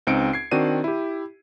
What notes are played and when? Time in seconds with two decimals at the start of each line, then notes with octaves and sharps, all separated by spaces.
0.07 C#2 C4 D#4 C#7 D7
0.33 G#6 C7
0.51 D#3 C4 D4 F#4 D5 D#7
0.84 E4 G4